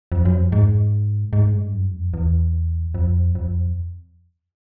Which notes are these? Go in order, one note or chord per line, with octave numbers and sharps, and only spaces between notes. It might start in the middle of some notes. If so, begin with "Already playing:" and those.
F2
F#2
F2
G#2
G#2
G2
F#2
F2
E2
F2
F2